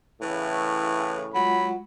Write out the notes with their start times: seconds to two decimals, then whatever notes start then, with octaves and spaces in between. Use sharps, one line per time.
0.22 A2 C#3 E3
1.35 F#3 G#3 F4 F#5 B5